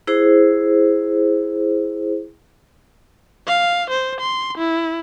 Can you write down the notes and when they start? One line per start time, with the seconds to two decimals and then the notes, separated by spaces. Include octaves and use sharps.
0.07 E4 G#4 C5
3.48 F5
3.90 C5
4.20 C6
4.58 E4